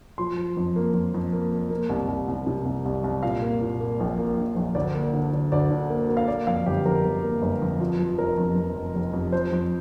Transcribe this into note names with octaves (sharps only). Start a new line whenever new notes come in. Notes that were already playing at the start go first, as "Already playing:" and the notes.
F3 C6
F3
F2
A#3
F2
F2
A#3
A#3
A#3
C2
C2
C2
C3
C2
C2
C2
A#2 F5
A#3
A#2
A#3
A#1
A#3
A#1
A#1
D2 D5
A#3
D3
D3
D2 D5
D3
A#3
A#3
F5
A#3 D5
F2 F5
G1 G4
F2 A#4
G1
A#3
G1
F2
F3
F3
F1 A#4
F2
F2
F1
F1
F2
F3 C5
F2